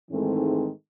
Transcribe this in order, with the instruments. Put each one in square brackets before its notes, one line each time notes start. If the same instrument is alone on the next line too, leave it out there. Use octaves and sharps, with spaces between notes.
[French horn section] G#2 D#3 E3 G#3 A3 C4